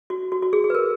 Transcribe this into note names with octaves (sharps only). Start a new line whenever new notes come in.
F#4
F#4
F#4
G#4
G#4
B4
A#4